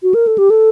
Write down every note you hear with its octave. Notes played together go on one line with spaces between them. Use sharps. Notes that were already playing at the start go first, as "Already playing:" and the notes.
F#4
A#4
A4
G4
A4